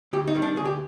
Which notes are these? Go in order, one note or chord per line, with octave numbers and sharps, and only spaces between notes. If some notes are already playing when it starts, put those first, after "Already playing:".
D2 G4
D#4
C3 D#3 G3
D4
D2 G#4
G4